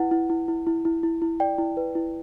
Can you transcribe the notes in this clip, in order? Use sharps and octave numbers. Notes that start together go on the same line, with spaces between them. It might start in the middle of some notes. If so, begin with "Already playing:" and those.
Already playing: E4 B4 F#5
E4
E4
E4
E4
E4
E4
E4
D5 G5
E4
B4
E4